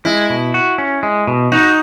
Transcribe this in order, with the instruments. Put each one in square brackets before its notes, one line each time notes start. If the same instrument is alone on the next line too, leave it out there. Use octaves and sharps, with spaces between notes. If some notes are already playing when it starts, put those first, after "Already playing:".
[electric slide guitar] G#3 [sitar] E4
[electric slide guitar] B2
F#4
C#4
G#3
B2
[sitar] D#4 [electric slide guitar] F#4